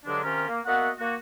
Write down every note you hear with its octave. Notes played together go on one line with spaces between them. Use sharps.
G2 D3 F#3 G#3 D4
C3 D#3 C#4 F4 G4 A#4
A#3
A#3 B3 F#4 D#5 E5 F#5
A#3 F#4